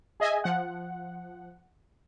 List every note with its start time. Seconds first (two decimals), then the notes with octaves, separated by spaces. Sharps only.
0.20 G#4 D#5 E5 G#5
0.44 F3 F#5